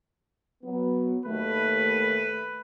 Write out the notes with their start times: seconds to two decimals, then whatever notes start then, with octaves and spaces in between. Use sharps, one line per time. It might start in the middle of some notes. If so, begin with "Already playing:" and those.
0.63 F#3 B3
1.26 D#2 D#3 A3 B4